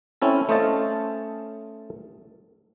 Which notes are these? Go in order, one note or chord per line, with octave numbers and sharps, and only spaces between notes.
C4 C#4 E4 A4
A3 C#4 C5 D#5 F5 A5